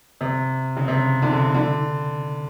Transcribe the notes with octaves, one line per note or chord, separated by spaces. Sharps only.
C3
C#3
C3
D3
C#3
D3